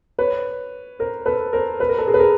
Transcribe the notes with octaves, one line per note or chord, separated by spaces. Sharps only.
B4 C#5
A#4 C5
A4 B4
A#4 C5
B4
A#4
A4
G#4 A#4
B4
G#4 A#4